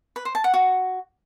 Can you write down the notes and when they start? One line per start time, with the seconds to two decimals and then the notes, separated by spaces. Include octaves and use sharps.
0.16 B4
0.25 C5
0.35 A5
0.44 F#5
0.54 F#4